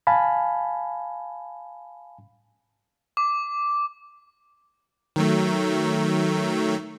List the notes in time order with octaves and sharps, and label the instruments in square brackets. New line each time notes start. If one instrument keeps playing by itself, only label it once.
[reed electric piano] F5 G#5 A5 B5
[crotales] D6
[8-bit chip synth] D#3 F#3 A3